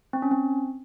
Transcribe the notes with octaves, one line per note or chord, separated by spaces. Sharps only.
C4
C#4
C4